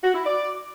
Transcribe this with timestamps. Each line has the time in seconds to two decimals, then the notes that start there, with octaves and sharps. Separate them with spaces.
0.03 F#4
0.14 E4
0.24 D5